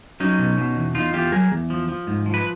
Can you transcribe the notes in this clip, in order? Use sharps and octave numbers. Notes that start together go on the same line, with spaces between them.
F#3 C#4 D#4
B2
B2
E2
E2 D#4 F4
E2 F4 G4
F#3 G#4 A#4
E2
F3
F3
G#2
F3
B4